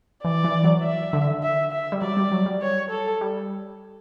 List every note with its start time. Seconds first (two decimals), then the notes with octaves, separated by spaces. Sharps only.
0.25 E3 D5
0.44 E3
0.64 F#3
0.84 E5
1.13 D3
1.43 E5
1.72 E5
1.92 G3
2.02 F#3 D5
2.17 G3
2.32 F#3
2.46 G3
2.62 C#5
2.91 A4
3.21 G3